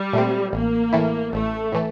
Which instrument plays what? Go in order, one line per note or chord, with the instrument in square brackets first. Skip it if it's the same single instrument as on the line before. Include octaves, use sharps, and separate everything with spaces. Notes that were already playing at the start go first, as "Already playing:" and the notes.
Already playing: [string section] G3
[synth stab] A#2 A3 C4
[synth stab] A1 [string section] A#3
[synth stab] A2 E3 A3 E4
[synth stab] A1 [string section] A3
[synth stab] A2 E3 A3